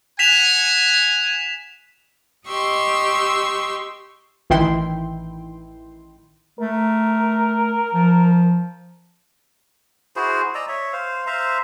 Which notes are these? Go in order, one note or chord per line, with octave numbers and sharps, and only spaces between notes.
F#5 G#5 B6 E7 F7
G4 D#5 C6 C#6 E6
A1 D#3 E3 E4 G5 C6
A3 A#4
F3
E4 F#4 G#4 C5
D5 D#5 A#5 E6
C#5 E5
C5 F5
C5 E5 F5 A#5